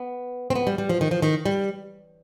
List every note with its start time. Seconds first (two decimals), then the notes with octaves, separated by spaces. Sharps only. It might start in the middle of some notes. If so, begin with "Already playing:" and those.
Already playing: B3
0.50 C4
0.55 B3
0.67 G3
0.78 G3
0.89 F3
1.01 D#3
1.11 F3
1.22 D#3
1.45 G3